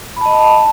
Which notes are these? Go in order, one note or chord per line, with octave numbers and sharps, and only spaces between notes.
D#5 A5 B5